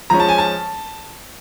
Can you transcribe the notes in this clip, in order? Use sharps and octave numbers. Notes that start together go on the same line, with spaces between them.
F3 G#3 C#4 A#5
A5
G#5
A5